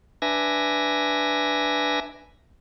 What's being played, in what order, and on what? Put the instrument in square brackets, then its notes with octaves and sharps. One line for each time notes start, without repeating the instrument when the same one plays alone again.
[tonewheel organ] D4 B4 E5 G#5 A#6